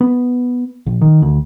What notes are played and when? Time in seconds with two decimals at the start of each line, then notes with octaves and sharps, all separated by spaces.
0.01 B3
0.86 A#1
1.01 D#3
1.22 D2